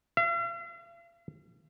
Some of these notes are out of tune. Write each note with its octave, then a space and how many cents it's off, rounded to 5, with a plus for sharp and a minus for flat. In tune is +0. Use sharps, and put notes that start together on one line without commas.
F5 -45